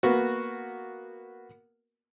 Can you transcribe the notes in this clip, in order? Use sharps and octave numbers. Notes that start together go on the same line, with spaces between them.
A#3 B3 F#4